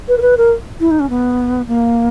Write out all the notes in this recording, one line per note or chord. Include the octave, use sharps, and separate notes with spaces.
B4
A#4
B4
A#4
E4
D#4
C#4
B3
A#3